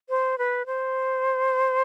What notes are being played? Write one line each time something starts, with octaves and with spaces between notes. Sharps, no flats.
C5
B4
C5